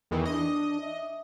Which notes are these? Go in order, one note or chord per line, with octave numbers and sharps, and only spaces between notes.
E2 D#3 E3
D4 D#5
E5